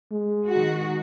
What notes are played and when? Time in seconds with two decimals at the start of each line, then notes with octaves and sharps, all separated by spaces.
0.11 G#3
0.48 D#3 F#4